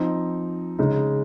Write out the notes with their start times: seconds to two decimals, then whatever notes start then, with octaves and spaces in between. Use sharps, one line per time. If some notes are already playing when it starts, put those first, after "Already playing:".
Already playing: F3 C4 D#4
0.79 C#3 G#3 D#4